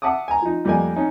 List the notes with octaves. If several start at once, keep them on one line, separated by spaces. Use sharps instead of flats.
E5 F#5 A5 D6 D#6
G#5 A#5
F3 D#4
F2 G3 A3 A#3 D#5 G#5
C#4 D#4